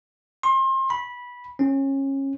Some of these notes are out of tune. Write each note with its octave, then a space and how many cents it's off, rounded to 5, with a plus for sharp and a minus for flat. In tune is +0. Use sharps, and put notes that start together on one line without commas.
C6 +30
B5 -15
C#4 -25